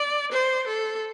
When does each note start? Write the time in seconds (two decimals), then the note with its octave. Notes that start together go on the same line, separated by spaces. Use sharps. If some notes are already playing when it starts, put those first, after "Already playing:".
Already playing: D5
0.33 C5
0.67 A4